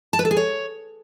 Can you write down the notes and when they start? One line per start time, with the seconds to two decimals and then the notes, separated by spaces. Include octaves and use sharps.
0.13 A5
0.19 B4
0.25 A4
0.31 G#4
0.37 C#5